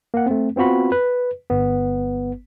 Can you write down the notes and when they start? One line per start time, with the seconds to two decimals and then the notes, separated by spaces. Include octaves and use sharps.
0.14 A#3 F#5
0.26 A3 C4
0.56 B3 C4 F4 F#4 B5
0.92 B4
1.50 G1 B3